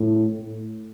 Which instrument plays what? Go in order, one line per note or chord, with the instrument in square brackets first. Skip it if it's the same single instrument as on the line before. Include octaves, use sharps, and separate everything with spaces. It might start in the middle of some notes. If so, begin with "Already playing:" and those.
Already playing: [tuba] A2